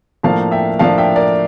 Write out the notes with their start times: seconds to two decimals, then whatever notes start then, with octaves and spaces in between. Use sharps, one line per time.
0.23 A2 F3 A#3 D4 F5 A5
0.52 E5 G5
0.79 A2 F3 A#3 D4 F5 A5
0.98 E5 G5
1.16 A#4 D5